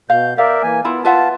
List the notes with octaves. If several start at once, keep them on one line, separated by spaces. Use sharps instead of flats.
B2 F5 G6
A#4 D5 E5 F5
E3 A#3 G#5
B3 E4 F4 B5
F4 B4 E5 F#5 A5